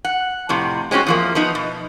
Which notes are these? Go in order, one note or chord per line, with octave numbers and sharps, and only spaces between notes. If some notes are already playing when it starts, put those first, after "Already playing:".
F#5
F2 A2 C3
G#3 C4 C#4 E4 F#4
E2 F3 A#3
F3 B3 D#4
B2